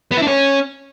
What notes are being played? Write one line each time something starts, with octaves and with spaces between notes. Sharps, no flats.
B3
E4
D4
C#4